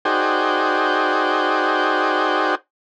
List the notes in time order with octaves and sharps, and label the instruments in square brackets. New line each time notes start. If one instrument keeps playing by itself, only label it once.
[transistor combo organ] D#4 F#4 G#4 C5 D5 G5